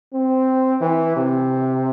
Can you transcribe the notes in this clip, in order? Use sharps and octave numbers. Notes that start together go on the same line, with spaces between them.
C4
E3
C3